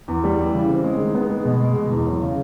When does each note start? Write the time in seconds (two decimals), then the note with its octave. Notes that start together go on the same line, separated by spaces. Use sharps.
0.08 E2
0.24 G3
0.38 E3
0.53 C#3
0.69 C4
0.84 G#3
0.99 D#3
1.15 B3
1.30 G#3
1.45 B2
1.60 G#3
1.76 B2
1.91 E2
2.07 F#3
2.22 C#3